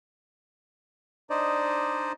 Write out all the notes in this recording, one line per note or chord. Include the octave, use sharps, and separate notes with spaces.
D4 D#4 C5 D5 D#5